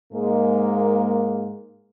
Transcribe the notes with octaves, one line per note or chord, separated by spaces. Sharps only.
G#2 G#3 A#3